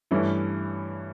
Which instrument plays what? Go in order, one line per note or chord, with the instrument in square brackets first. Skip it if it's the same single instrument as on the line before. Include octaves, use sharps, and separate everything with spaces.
[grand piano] G2 E3 A3 C#4 E4